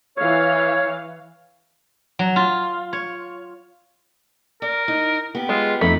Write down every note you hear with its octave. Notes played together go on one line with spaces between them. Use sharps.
E3 C#5 F5
F#3
F4
C#5
A#4 D5
D#4
B3 G4
G#3 F4
F2 A3 D#4 B5